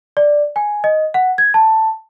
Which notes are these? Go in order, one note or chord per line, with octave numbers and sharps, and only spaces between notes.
D5
G#5
D#5
F#5
G#6
A5